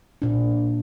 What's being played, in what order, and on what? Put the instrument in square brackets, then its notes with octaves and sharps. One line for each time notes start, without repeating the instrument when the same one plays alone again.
[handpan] A#2 D4